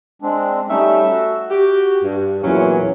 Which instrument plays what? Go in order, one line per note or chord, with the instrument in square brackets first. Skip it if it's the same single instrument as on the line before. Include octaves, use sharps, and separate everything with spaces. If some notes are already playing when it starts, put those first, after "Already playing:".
[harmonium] G#3 C4 D4
[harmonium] G3 C#4 D#4 [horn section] A3 E5
[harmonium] F#4
[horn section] G4
G2
[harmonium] E2 A#2 E3 [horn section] F#3 C#4